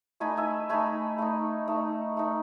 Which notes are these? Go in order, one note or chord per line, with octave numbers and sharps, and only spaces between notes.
A3 D#4 G#5 B5
E5 G#5
A3 D#4 G#5 B5
A3 D#4
A3 D#4
A3 D#4